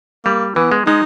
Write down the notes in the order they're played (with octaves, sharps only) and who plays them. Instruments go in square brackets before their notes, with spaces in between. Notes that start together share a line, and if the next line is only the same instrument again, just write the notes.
[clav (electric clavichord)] G3 [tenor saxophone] A#3
[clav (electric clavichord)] E3 [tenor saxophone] B3
[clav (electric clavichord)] G#3
[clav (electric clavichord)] G#3 [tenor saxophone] D#4